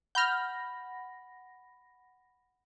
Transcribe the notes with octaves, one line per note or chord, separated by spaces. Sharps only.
F#5 B5 F6 G6 A#6